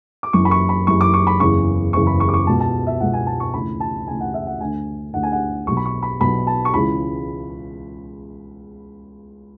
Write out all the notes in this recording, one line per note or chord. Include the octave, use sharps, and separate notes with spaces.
D6
F#1 F#2 E3 C#6
B5
C#6
B5
F#1 F#2 E3 C#6
D6
C#6
B5
F#1 E2 C#3 C#6
F#1 E2 C#3 C#6
B5
C#6
D6
C#6
C#2 B2 A5
A5
E5
C#2 B2 F#5
G#5
A5
C#6
D2 C#3 E3 B5
A5
D2 C#3 E3 G#5
F#5
E5
F#5
D2 D3 G#5
D2 D3 F#5
G#5
F#5
B1 B2 C#6
B5
C#6
B5
B1 B2 B5
A5
C#6
C#2 C#3 E3 B5